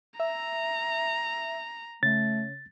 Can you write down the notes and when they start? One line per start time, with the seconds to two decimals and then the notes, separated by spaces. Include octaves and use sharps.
0.20 E5 A#5
2.03 C#3 A3 A6